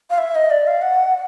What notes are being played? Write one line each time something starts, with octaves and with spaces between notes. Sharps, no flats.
F5
E5
D#5
D5
F5
F#5